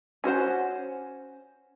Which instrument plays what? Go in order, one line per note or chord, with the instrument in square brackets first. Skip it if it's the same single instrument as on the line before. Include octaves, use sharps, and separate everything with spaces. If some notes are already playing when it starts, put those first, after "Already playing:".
[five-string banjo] C#4 F#4 C5 F#5